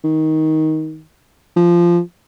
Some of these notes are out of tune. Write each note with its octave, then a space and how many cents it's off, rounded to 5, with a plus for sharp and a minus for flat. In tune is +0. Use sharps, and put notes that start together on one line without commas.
D#3 +15
F3 -15